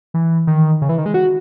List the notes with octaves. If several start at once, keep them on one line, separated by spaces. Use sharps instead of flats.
E3
D#3
C#3
E3
D#3
G#3
F#4